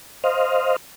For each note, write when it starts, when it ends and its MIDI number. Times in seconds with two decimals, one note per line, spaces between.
0.24 0.76 72
0.24 0.76 75
0.24 0.76 77